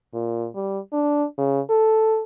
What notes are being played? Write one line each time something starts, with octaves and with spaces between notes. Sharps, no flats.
A#2
G3
D4
C#3
A4